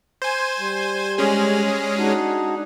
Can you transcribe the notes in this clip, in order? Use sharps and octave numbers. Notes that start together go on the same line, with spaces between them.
C5 G#5
G3
G#3 C#4 G#4
D4 D#4 F#4